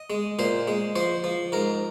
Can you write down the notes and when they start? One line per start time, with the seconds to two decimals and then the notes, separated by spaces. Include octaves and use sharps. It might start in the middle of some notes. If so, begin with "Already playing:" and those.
Already playing: D#5
0.10 G#3
0.39 A#2 C5
0.68 G#3
0.96 F3 C5
1.24 F3
1.52 G#2 A#4